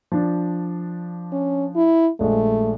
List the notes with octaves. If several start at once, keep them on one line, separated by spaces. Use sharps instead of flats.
F3 D4
C#4
E4
A#1 G#3 A3